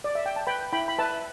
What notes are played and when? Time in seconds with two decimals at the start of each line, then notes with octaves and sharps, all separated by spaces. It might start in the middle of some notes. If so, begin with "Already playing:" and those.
0.04 D5
0.15 E5
0.26 G5
0.36 A5
0.47 B4 G5 B5
0.73 E4 G5 B5
0.88 B5
0.98 B4 E5 A5